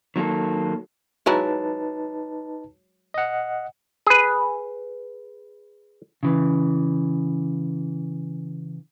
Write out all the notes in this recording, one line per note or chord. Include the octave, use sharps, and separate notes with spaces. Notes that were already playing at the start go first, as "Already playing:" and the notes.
D#3 F#3 A#3 A4
F#3 G#3 D#4 E4 B4 A5
D#5 F#5
G#4 B4
C#3 E3